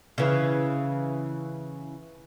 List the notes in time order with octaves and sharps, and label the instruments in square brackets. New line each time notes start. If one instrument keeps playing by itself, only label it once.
[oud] C#3 E3